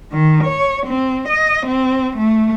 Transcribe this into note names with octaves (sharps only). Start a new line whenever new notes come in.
D#3
C#5
C4
D#5
C4
A3